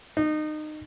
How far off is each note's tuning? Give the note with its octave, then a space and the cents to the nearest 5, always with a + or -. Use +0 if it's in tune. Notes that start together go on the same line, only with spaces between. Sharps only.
D#4 -25